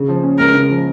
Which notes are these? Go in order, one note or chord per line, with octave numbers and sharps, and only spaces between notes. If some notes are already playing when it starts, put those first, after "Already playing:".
Already playing: C#3
F3
C#4
C#2 A#4
C#3
F3